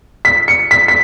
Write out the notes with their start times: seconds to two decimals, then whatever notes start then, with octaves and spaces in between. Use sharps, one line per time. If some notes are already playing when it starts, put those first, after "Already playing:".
0.25 B6
0.48 C#7
0.71 B6
0.88 B6